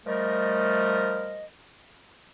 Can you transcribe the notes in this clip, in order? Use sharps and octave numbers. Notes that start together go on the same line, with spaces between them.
F3 G3 A3 A#4 D#5